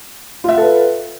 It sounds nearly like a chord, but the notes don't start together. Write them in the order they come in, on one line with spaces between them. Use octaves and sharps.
F4 E5 F#5 A4 B4